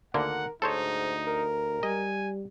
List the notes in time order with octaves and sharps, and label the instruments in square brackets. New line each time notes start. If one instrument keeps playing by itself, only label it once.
[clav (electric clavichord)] D2 D3 A#3 [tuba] D#3 [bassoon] A#4 [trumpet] F#5
[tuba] D2 [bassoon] G#2 [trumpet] D#4 [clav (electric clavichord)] A4 C5 C#5
[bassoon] A#4
[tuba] G3 [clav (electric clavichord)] D#5 [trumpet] G#5